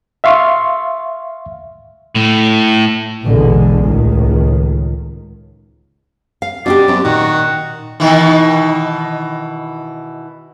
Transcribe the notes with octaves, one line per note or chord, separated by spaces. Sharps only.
E5 F5 C6 C#6
A2
A#1 E2 B2 D3 G#3
C#2 A2 D#3
F5
B2 C#4 D4 G4 D5
F#2 C4
A#2 D#3 F#4
B2 D#3 E3